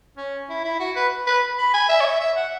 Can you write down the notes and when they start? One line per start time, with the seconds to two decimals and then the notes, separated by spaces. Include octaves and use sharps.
0.17 C#4
0.49 E4
0.64 E4
0.80 F#4
0.96 B4
1.27 B4
1.59 B5
1.74 G#5
1.89 E5
2.01 C#5
2.05 E5
2.21 E5
2.37 F#5